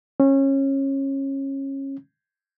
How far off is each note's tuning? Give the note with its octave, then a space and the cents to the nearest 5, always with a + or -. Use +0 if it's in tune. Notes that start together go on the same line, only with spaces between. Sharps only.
C#4 -25